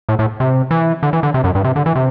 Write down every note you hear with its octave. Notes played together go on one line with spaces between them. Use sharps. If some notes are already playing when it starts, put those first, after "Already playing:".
A2
A2
C3
E3
D3
E3
D3
C3
F#2
G2
C3
D3
E3
C3